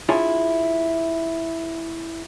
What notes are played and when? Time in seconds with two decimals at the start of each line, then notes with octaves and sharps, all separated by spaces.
0.09 D4 E4 F4 G#4 C#5 G#5